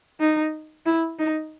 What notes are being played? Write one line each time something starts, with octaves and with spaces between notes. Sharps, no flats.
D#4
E4
D#4